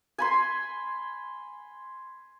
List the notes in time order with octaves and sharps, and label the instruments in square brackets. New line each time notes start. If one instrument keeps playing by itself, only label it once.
[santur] G#5 B5 C6